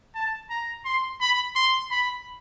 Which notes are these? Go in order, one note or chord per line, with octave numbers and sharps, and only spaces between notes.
A5
A#5
C6
B5
C6
B5